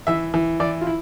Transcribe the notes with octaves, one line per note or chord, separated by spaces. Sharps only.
E3 E5
E3
E3 D5
F4
E4